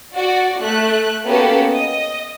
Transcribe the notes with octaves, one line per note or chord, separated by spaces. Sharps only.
F#4 D5
A3 F#6
A#3 B3 C#4 F#4 G4 A4
D#5